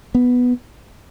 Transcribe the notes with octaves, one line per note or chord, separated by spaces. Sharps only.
B3